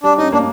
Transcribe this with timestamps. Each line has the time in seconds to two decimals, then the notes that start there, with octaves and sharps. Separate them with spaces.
0.03 G3 D4
0.18 C#4 D#4
0.32 A#3 D4